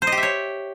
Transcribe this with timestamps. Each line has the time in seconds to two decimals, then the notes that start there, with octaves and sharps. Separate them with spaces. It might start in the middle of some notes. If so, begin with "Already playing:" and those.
0.02 C5
0.07 D#5
0.12 G4
0.18 E5
0.23 C#5